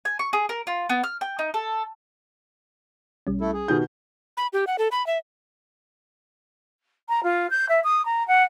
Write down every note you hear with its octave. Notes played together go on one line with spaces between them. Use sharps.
G#5
C#6
G#4
A#4
F4
B3
F6
G5
D#4
A4
B1 G3 C#4
A3 E4 A4
G#4
B2 D#3 F4 G4 G6
B5
G4
F#5
A4
B5
E5
A#5
F4
G6
E5
D#6
A#5
F#5